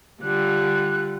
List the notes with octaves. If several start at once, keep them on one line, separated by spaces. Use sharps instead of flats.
D3 G3 F4 F#6